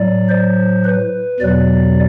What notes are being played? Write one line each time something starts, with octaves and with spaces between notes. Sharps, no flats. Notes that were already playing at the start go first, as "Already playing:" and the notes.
Already playing: A2 F#3 D5
C5
B4
E2 B2 F#3 D5